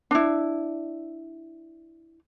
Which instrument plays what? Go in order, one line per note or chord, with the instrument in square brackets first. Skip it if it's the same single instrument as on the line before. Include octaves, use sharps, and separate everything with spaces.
[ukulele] D4 E4